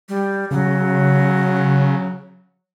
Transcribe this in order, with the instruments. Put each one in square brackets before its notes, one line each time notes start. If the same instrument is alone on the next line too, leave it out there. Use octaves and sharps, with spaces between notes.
[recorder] G3
[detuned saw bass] C#3 [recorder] F#3